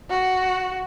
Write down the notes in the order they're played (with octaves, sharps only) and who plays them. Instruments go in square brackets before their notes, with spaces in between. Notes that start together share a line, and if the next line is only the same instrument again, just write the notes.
[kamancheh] F#4